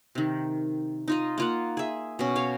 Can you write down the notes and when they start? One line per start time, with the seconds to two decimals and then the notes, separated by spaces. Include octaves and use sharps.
0.15 C3 D#3
1.08 D#4 F4 D#5
1.38 A#3 F4 F#5
1.77 G#4 E5
2.19 B2 C#4
2.36 C#5 F5